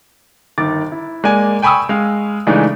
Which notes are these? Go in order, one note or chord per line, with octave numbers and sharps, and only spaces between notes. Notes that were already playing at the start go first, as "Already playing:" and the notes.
G1 D#3 D6 A6
E4
G#3 A#3 D5 G#5
G5 G#5 B5 C#6 D#6 E6
G#3 F5
C#3 E3 G#3 A3 D4 D#4